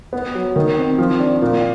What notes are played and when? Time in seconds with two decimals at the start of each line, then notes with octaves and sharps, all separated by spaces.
0.13 B3
0.35 F#3
0.56 D#3
0.77 C4
0.98 F3
1.20 D4
1.42 A#2